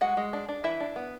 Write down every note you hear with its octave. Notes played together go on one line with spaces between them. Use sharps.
G#3 F#4 F#5
G#3
D4
D4
E3 E4 E5
D4
B3